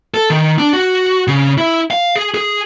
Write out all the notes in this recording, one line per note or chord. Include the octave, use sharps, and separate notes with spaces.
A4
D#3
D4
F#4
C#3
E4
F5
G#4
G#4